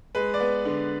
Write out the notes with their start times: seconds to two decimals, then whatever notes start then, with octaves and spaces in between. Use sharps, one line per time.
0.15 G#3 B4
0.34 D5
0.40 B3
0.65 D3